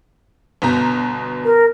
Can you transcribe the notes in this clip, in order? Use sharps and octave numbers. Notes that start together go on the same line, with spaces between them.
G1 B2 A#5
A#4